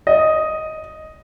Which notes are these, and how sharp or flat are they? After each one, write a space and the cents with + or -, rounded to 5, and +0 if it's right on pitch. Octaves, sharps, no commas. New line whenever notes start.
D#5 +5